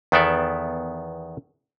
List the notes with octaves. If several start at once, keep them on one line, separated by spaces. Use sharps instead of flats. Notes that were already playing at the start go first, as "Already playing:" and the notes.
E2 D#3 B3 A4 D5 E5